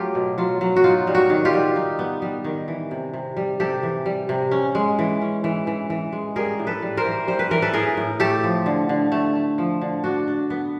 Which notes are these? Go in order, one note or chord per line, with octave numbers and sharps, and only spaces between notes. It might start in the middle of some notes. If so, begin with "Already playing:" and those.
Already playing: F#3 A3 F4 G4
B2
F#3 F4
F#3
F#4
D#4 F4
G3
F#4
D#3
F4 G4
G3
D#4
B3
G3
D#3
E3
C3
C3
G3
C3 G4 A4
E3
G3
C3
C#4
G#3
E3
C#4
E3
E3
E3
G#3
G3 G#4 A#4
A2
A4 B4
G3
A#4 C5
E3
G3 C5
B4
E3 A#4
A4 B4
A2 G#4 A#4
A2
A3 G4 A4
F3
D3
D3
A3
A3
F3
D3
D4 F#4
D4
B3